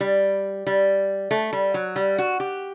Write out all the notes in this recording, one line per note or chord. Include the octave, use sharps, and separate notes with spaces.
G3
G3
A3
G3
F#3
G3
F#4
G4